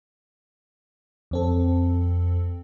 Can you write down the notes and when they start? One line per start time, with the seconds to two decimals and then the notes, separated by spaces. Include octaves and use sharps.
1.31 F2 C4 A4